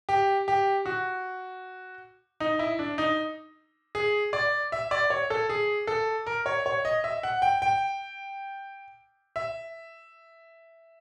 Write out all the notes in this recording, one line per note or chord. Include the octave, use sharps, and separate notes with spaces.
G4
G4
F#4
D#4
E4
D4
D#4
G#4
D5
E5
D5
C#5
A4
G#4
A4
A#4
C#5
C#5
D#5
E5
F#5
G5
G5
E5